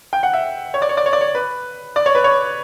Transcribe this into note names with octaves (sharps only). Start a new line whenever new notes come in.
G5
F#5
E5
C#5
D5
C#5
D5
C#5
D5
C#5
B4
D5
C#5
B4
C#5